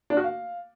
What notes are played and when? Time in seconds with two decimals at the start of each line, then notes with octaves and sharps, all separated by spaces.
0.10 D4
0.17 F#4
0.24 F5